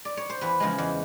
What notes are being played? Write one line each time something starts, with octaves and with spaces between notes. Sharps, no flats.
D5
C#5
C5
E2 B4
C#3 F3 G#3
E2